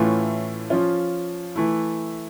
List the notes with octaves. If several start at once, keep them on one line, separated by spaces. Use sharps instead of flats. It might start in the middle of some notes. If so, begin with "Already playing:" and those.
Already playing: A2 E3 A3 C#4 F4
F3 C#4 F4
E3 A3 E4